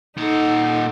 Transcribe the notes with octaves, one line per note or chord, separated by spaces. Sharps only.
A#2 D#4 A4 F#5